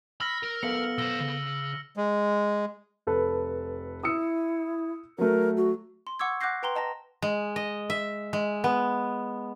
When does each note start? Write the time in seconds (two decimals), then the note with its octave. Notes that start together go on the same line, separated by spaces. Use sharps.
0.21 B5 E6 F6 A#6
0.43 A#4
0.63 B3 A4 F5 C#7 F#7
0.98 B1 C5 E6 A#6 F#7
1.21 C#3
1.97 G#3
3.07 F1 A4 B4
4.03 E4 D#6 E6 C#7
5.18 F#3 A3 A#4
5.57 F#4
6.07 C6
6.19 F#5 C#6 D6 E6 G#6
6.41 F#5 D6 F#6 G6 A#6 C7
6.63 B4 G5 A#5 C6 G7
6.76 D#5 A5 A#5 A#6
7.22 G#3
7.56 D#5
7.90 E5
8.33 G#3
8.64 B3